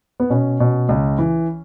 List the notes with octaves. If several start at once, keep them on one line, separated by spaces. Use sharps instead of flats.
B3
B2 C#4
B2
C#2
E3